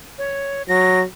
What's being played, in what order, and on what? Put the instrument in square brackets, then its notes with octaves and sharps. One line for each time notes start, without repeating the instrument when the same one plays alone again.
[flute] C#5
[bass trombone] F#3 [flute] A#6